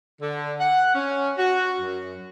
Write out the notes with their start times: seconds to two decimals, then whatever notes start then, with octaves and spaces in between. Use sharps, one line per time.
0.21 D3
0.60 F#5
0.95 C#4
1.38 F#4
1.81 F#2